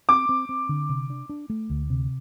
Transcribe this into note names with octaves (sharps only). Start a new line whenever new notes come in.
C4 D6
C4
C4
D3
C3
D4
D4
A3
D2
C3